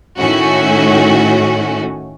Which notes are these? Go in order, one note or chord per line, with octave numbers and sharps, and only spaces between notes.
A2 D#3 A3 C#4 F#4